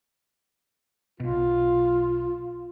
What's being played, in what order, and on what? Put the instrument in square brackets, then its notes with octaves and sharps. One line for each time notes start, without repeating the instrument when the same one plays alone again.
[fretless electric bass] B1 B2 [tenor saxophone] F4